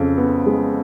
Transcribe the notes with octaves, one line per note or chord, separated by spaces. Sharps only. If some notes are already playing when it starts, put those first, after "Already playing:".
Already playing: F2 C#3
B3
G#3